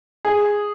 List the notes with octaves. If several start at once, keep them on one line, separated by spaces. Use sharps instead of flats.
G#4